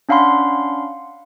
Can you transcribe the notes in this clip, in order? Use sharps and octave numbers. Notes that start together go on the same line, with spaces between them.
C#4 D4 F5 F#5 B5 C6